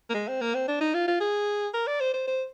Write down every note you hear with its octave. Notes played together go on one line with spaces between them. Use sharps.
A#3
G#3
C4
A#3
C4
D4
D#4
F4
F4
G#4
A#4
D5
C5
C5
C5